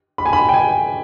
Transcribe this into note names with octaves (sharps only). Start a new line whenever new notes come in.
B5
G#5
B5
G5
G#5